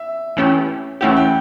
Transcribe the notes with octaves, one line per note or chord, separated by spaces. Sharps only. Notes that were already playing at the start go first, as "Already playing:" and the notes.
Already playing: E5
E3 A3 C#4 E4 G4
E3 A3 C#4 E4 G4 F#5
G5